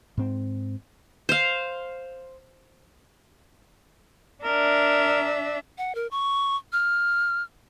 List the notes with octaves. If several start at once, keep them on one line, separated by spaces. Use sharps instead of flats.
G#2 C4
C5 F5
D4 A#4 E5
F#5
A#4
C#6
F6